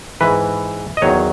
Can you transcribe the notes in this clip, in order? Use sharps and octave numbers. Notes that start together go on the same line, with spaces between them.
G#2 E3 B4
D#5
E2 D#3 F#3 C#5